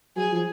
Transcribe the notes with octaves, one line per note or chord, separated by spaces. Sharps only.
F#3 G#4
F3